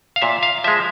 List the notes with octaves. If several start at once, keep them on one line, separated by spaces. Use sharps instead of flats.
F5
A#2 E5
F5
F3 G#3 E5